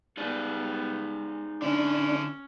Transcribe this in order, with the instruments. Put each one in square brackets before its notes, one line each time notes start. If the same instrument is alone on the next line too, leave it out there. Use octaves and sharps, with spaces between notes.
[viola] G3 B3 [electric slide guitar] D#4 G#4 D5
[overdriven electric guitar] D3 E4 [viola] C#4 [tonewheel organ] D4